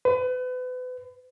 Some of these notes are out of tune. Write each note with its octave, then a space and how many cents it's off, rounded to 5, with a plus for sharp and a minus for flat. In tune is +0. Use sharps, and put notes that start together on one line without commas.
B4 +35